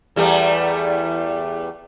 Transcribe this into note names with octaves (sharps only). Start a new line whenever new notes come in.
E2 G3 A3